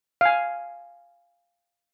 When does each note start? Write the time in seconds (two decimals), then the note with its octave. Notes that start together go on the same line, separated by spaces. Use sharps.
0.21 F5 G#5